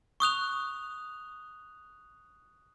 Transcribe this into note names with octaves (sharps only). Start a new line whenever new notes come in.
C#6 D#6 F#6 F7